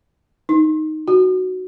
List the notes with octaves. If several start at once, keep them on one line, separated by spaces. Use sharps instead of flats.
D#4
F#4